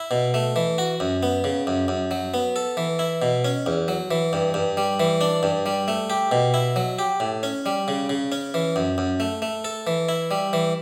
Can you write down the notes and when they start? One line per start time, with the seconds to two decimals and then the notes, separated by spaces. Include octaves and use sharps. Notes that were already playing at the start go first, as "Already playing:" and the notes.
Already playing: E4
0.11 B2
0.34 A3
0.56 E3
0.78 F#4
1.00 F#2
1.23 B3
1.44 C#3
1.67 F#2
1.88 F#2
2.11 F#3
2.34 B3
2.56 A4
2.77 E3
2.99 E4
3.22 B2
3.45 C#4
3.66 E2
3.88 F#3
4.11 E3
4.33 G2
4.54 G2
4.77 G3
5.00 E3
5.21 D4
5.43 G2
5.66 G3
5.88 A3
6.10 G4
6.32 B2
6.54 E4
6.76 F#3
6.99 G4
7.20 A2
7.43 C#4
7.66 G3
7.88 C#3
8.09 C#3
8.32 C#4
8.54 E3
8.76 F#2
8.98 F#2
9.20 A3
9.42 A3
9.65 A4
9.87 E3
10.09 E4
10.31 G3
10.53 E3